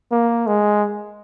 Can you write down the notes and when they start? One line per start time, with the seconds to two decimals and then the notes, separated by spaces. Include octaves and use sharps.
0.12 A#3
0.47 G#3